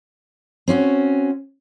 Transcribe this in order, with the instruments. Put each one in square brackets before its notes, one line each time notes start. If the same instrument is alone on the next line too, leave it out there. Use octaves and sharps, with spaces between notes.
[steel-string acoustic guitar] C4 C#4 F4 F#4